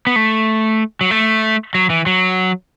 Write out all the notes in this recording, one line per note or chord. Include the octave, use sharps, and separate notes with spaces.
B3
A3
F#3
A3
F#3
E3
F#3